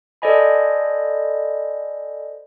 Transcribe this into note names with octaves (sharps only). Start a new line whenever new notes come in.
A4 C5 D5 D#5 G#5 B5